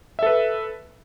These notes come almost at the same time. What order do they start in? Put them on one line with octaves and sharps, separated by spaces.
E5 A4 B4